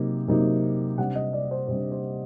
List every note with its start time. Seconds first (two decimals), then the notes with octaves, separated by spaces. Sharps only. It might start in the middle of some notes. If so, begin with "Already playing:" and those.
Already playing: C3 F#3 A#3 D#4
0.28 C3 F#3 A#3 D#4
0.98 C3 G3 D4 F#5
1.15 D#5
1.33 D5
1.51 C5
1.67 C3 G3 D4 C5
1.91 C5